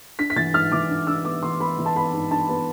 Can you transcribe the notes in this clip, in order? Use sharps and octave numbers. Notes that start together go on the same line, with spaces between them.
D4 B6
B6
E3 A6
G#2 F6
E3 D6
D4
D4 E6
B3 D6
E3 C6
B3 B5
E3
A5
B3 B5
G#2
D4 A5
B3